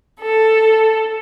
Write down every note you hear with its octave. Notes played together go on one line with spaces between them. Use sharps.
A4